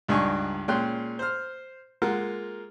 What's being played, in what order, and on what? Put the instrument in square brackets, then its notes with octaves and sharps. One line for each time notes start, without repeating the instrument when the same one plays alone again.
[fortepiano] C#2 G2 D4 D#4 G#5 C#6
A#2 G#3 C#4 G5 C6 F#6
C5 F6
G#3 A#3 F4 A#4 F#5